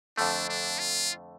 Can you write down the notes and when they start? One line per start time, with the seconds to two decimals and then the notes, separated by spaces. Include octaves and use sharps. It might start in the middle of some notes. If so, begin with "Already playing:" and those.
0.17 F2 D3 A3 D4
0.49 D4
0.79 F4